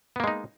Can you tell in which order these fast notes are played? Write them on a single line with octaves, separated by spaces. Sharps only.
B3 A#3 G#3 D#4